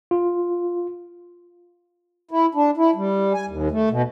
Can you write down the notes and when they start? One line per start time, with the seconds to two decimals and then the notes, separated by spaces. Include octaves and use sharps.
0.11 F4
2.31 E4
2.55 D4
2.77 E4
2.95 G3
3.34 G#5
3.48 D#2
3.71 A3
3.90 B2